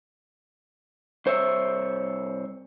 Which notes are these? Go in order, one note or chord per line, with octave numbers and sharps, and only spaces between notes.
C2 C5 C#5 E5